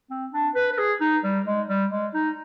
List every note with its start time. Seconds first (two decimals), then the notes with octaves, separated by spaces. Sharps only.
0.10 C4
0.33 D4
0.55 B4
0.73 B4
0.78 G#4
1.01 D#4
1.24 G3
1.46 G#3
1.69 G3
1.91 G#3
2.14 D#4